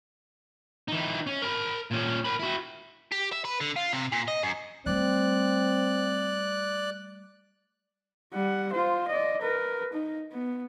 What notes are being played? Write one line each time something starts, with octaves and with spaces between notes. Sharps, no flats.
E3 D#4
C#4
A#4 B5
A#2 C#4
A#4 B5
E4 F#4
G4
E5
B4
D3
F4
C3
A#2
D#5
F#2
G3 A3 C4 D5 F#6
G3 F#5
F4 C5
D5 D#5
A#4 B4
D#4
B3